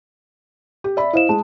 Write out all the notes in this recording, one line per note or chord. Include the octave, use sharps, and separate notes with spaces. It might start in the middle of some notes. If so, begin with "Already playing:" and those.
G4
D5 E5 B5
E4 C5 D#5 F5 E7
G#3 A5